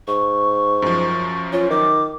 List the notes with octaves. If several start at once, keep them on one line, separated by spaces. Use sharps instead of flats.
G#2 C#6
F#2 F3
C#4 F4
D#3 D6